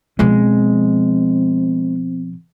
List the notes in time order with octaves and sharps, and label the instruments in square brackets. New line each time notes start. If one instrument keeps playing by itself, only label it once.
[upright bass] B2 F3 [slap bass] G#3 [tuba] C4